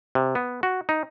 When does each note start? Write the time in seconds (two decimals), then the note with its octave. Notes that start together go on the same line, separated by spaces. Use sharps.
0.15 C3
0.35 B3
0.63 F#4
0.89 D#4